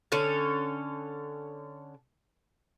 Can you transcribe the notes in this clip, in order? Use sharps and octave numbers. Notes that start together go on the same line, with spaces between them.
D3 C#4 A4 C#5